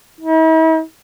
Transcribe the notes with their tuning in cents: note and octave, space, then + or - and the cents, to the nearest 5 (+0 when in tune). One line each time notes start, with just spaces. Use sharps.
E4 -45